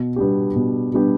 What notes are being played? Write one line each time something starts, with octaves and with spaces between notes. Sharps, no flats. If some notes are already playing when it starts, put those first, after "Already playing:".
Already playing: B2
G3 B3 D4 G4
B2
G3 B3 D4 G4